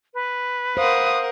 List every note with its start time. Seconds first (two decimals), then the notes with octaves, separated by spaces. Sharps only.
0.14 B4
0.77 A#4 C5 F5 F#5 D#6